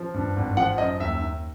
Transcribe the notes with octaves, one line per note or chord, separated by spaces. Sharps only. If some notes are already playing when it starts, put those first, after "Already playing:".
Already playing: F3
G2
G#1
F3 F#5
F#2 D#5
D#2 E5
D#2